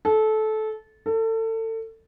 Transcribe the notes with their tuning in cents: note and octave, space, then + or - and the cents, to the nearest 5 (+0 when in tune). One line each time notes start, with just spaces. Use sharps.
A4 -20
A4 +30